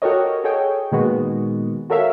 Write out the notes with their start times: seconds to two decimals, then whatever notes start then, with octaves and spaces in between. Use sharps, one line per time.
0.02 F#4 G4 A4 A#4 C#5 D#5
0.44 F#4 G#4 A4 C#5 D#5 G5
0.92 A#2 D#3 G#3 B3 F#4
1.90 F#4 A4 A#4 C#5 E5 F5